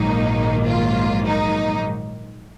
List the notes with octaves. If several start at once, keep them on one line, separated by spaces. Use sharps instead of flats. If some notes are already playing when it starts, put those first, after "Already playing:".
Already playing: A#1 G#2 D#3 F#3 A#3 D#4
F4
D#4